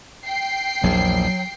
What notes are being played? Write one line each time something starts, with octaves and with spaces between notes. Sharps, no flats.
G5 C7
A#1 E2 F#3